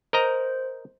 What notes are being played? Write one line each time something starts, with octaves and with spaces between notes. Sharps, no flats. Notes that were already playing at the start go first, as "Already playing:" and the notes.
A#4 C5 D#5 A#5